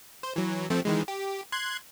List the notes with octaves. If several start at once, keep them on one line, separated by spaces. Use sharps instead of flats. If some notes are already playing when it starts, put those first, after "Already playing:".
C5
E3 F#3
F3 A3 C4
D#3 E3 G#3
G4
C6 F#6 G#6